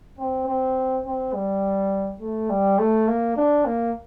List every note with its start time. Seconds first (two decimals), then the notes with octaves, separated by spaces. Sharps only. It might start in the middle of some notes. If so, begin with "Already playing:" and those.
0.18 C4
0.47 C4
1.05 C4
1.34 G3
2.21 A3
2.49 G3
2.79 A3
3.08 A#3
3.36 D4
3.65 A#3